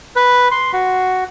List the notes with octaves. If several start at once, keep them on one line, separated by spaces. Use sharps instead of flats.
B4
C6
F#4